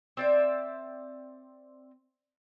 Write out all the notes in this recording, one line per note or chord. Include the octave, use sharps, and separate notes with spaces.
C4 D5 E5